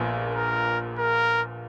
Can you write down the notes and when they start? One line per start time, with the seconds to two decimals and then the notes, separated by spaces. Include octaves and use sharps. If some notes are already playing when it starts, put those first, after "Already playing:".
Already playing: A#1 A#2 F3 B3
0.35 A#4
0.98 A#4